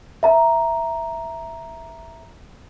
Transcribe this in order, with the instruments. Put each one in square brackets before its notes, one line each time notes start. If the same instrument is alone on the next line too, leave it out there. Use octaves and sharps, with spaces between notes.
[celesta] E5 A#5